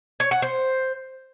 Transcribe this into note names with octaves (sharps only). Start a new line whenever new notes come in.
C#5
F#5
C5